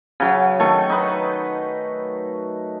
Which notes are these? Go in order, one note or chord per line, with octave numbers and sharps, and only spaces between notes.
C#3 F#3
D#3 A3 C#6
D#4 B4